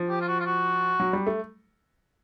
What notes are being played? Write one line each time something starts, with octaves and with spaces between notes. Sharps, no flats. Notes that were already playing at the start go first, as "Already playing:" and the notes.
Already playing: F3
G4
F4
F#4
F4
F#4
F#3
G3
A3